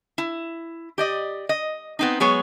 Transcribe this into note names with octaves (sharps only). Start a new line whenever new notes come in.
E4
G4 D5 D#5
D#5
B3 C4 D#4
F#3 G#3 B3 G#4 C#5